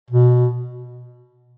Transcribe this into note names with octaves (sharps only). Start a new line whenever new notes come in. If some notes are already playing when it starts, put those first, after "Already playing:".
B2